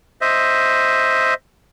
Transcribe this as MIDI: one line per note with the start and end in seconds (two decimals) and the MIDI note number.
0.21 1.34 72
0.21 1.34 75
0.21 1.34 76